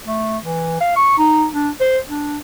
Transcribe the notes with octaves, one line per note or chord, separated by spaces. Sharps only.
A3
E3
F5
C#6
D#4
D4
C5
D4